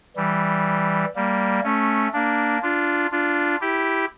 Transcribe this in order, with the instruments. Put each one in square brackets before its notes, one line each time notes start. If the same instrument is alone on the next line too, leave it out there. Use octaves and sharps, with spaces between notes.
[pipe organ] E3 G3
G3 A#3
A3 C#4
A#3 D4
D4 F4
D4 F4
E4 G4